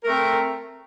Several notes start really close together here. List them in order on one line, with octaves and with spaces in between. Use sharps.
A#4 A3 C4